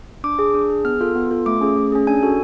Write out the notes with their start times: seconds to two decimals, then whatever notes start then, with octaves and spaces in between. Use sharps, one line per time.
0.24 D4 D6
0.39 G#4
0.54 D4
0.70 G#4
0.85 B3 F6
1.01 F4 A4
1.15 B3
1.31 F4 A4
1.46 A3 D6
1.61 C#4 G#4
1.76 A3
1.92 C#4 G#4
2.07 D4 G#5
2.23 F#4 A4